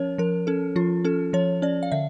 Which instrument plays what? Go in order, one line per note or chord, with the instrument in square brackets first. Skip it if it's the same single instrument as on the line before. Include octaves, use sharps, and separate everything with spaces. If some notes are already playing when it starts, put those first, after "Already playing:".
Already playing: [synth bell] F3 C#4 A#4 C#5
F3 A#4
C#4 A4
F3 F4
C#4 A4
F3 C#5
C#4 D5
F5
D3 E5